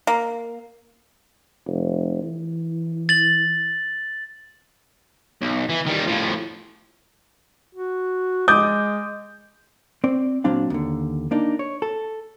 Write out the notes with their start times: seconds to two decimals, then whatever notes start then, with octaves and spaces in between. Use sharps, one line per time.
0.07 A#3
1.67 F1
2.23 E3
3.09 A6 F#7
5.42 B1
5.69 E3
5.86 D#3 G3
6.07 A2 F3
7.75 F#4
8.48 G#3 D6 D#6 G6
10.04 C4 D5
10.44 A#2 F#3 C4 D4 F5
10.70 D#2 D3
11.31 A#3 D4 D#4
11.59 C#5
11.82 A4